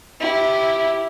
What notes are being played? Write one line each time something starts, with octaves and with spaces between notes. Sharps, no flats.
E4 G4